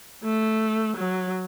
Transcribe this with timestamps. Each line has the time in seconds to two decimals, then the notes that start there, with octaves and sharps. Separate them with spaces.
0.23 A3
0.97 F#3